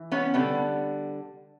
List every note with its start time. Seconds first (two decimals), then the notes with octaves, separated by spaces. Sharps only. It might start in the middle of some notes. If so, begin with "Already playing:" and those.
Already playing: E3
0.12 B3 C#4
0.34 D3 G3 B3 C#4